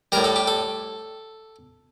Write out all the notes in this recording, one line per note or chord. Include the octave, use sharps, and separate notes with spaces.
A2 G3 A#4
A4
G4
A4